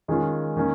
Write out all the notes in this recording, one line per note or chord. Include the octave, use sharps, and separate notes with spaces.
D#3 G#3 C#4 F4
D#3 A#3 C#4